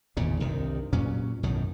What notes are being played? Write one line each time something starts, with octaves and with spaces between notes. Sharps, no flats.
G#1 E2 A#2 C#3
C2 G2 C3 D#3
G2 A#2 F#3 C#4
B1 F#2 A2 D#3